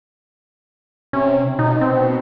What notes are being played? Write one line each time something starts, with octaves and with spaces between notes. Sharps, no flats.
C3 C#4
B2 D#4
C4